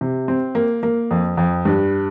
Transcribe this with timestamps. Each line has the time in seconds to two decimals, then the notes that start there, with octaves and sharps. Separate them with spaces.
0.01 C3
0.28 C4
0.55 A#3
0.83 A#3
1.11 F2
1.37 F2
1.65 G2